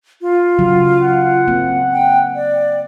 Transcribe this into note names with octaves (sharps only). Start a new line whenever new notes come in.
F4
C#3 F#3 F#4
F#5
A#3 C4
G5
D5